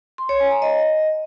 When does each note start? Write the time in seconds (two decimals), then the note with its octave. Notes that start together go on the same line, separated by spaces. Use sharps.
0.18 C6
0.29 C#5
0.40 G#5
0.51 A#5
0.62 D#5